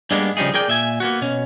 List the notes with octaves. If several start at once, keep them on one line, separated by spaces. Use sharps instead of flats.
G2 G3 G#3 A#3 B3 D4
C#3 F3 G3 D#4 G#4
G#4 A#4 D5 G5
A#2 E5 G#5
A#3 B3 F#4
B2 C#4